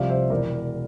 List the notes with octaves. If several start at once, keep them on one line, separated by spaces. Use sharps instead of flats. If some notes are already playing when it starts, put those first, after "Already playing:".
Already playing: C2 C3 F3 D5 F5
C5 E5
E1 E2 E3 A#4 D5